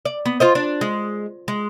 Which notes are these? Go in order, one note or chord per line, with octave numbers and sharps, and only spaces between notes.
D5
B3
F4 C5 D#5
D4
G#3
G#3